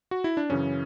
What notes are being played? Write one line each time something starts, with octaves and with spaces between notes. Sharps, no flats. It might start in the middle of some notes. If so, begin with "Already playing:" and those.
F#4
E4
D4
F#2 C#3 E3 C#4